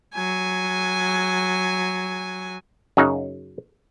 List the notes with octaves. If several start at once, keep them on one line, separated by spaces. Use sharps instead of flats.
F#3 G#5
F#2 C#3 F#3 D#4